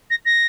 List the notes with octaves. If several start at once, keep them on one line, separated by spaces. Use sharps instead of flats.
A#6
A#6